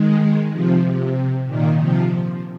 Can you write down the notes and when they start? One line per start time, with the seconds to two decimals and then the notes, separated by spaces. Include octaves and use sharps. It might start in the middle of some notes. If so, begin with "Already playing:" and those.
Already playing: D#3 G#3
0.51 C3 F3
0.83 C3
1.46 A#2 D#3
1.78 C3 F3